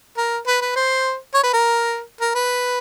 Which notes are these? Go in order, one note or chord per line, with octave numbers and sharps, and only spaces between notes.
A#4
B4
B4
C5
C#5
B4
A#4
A#4
B4